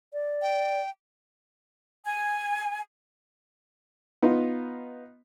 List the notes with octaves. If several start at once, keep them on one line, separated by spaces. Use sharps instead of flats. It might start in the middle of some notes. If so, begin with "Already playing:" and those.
D5
G5
G#5
B3 D#4 F4